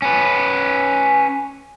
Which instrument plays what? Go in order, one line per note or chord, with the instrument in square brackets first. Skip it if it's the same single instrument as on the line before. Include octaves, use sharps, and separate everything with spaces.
[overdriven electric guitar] C#4 B4